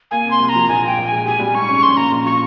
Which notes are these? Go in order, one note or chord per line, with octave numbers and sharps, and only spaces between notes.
A#3 G#5
C3
C6
C2
A#5
F3
A#1 G#5
A#2 G5
A#1
G#5
G#3
G4 G#5
G3
G#2 C#6
C#4
A#1 C6
A#2 A#5
A#1
F3 C#6